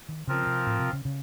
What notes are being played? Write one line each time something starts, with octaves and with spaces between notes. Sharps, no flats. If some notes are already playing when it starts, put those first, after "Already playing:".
D#3
C#3 F3 C4 F4 A#4
C3
A2
C3
C#3
C#3